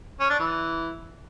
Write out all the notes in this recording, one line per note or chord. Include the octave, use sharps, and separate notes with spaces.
C#4
D4
E3